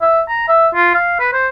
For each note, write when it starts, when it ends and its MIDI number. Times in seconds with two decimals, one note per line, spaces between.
0.02 0.21 76
0.28 0.48 82
0.48 0.68 76
0.74 0.94 65
0.95 1.15 77
1.20 1.32 71
1.33 1.48 72